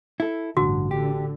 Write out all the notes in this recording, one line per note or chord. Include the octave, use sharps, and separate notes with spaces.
E4 A4
A1 G2 D3 F#4
D3 G4